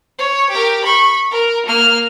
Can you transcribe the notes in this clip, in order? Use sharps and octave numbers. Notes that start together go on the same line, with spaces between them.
C#5
G4 A#4
B5 C#6
A#4
A#3 F6